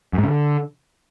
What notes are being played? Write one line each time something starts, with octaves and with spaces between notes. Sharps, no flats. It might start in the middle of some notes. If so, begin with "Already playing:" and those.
F#2
G#2
C#3
D3